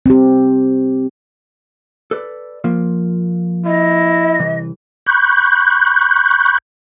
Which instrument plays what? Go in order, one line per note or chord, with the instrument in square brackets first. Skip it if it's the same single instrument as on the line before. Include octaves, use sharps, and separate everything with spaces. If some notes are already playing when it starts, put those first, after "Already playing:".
[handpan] C4 G4
[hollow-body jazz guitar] A4 B4 D5
F3 A#3 F4
[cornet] E4 [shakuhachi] D#5
[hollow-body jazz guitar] C2 E3
[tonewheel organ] B5 C#6 F#6 G6